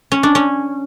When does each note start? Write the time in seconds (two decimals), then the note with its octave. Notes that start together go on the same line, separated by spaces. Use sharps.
0.12 C#4
0.23 D4
0.35 C#4